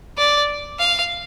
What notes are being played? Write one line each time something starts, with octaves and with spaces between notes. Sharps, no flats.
D5
F5